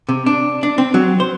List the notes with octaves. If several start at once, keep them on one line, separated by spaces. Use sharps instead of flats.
C3
D4
D4
C4
F#3
C5